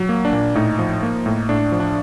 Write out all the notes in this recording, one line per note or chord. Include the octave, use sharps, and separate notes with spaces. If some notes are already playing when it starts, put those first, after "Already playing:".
Already playing: F#3
A#3
D4
A#2
A2 D#4
F3
A#3
A2
A2 D4
F3
D4